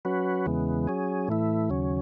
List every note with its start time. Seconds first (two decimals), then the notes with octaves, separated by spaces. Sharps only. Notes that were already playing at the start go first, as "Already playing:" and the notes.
0.05 F#3 C#4 F#4 B4
0.46 E2 C#3 E3 G#3 B3
0.87 F#3 C#4 G#4
1.28 A2 E3 A3 E4
1.70 D#2 C#3 F#3 C#4